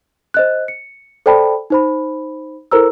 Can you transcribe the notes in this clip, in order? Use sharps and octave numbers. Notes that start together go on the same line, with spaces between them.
C5 D#5 F#6
C#7
A4 C5 D5 G5 A5 B5
D#4 C5 B5
E4 A4 A#4 C5 A#5 E6